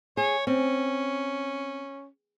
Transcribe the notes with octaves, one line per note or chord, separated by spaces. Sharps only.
G#4 C#5
C4 C#4